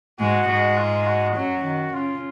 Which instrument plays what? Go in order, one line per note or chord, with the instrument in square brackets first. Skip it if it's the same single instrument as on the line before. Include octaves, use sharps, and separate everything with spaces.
[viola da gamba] G#2 G#3 [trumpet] F#4
[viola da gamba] G#2 G#3
[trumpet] F4
F#4
[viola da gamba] F#2 F#3 [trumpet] F#4
[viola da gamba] D#3
[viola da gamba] C#3 [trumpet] F4